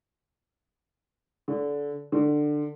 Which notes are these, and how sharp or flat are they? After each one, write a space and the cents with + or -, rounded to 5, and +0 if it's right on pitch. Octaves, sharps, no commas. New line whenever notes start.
D3 -25
D3 +15